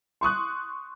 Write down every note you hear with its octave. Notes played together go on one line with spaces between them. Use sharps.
C6 C#6 D#6 F#6